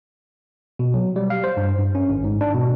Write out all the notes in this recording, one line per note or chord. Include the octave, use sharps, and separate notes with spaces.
B2
F#3
G3
F5
C5
G2
G2
C#4
G#1
G#2
D4
B2